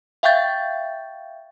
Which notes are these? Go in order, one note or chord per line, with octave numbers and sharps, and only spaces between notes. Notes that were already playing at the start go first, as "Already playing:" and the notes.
E5 F5 G5 C#6 G6 A6